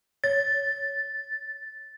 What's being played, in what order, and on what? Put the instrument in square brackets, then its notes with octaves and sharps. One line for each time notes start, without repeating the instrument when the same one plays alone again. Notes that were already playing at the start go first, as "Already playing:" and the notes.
[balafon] C#5 [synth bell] A6